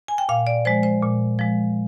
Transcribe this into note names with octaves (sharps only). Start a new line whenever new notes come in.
G#5
G5
A#2 F5
D5
F3 G#3 C5
C5
A#2
F3 G#3